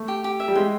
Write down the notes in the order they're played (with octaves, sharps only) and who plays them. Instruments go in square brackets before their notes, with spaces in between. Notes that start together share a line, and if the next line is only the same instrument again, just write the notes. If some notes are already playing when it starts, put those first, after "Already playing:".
Already playing: [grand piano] A3
[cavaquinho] G4
G4
E5
[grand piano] G3
[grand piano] G#3 [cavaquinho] G5